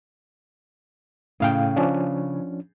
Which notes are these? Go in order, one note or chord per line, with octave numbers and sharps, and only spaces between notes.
A2 C#3 F5 G5
F3 C#4 D4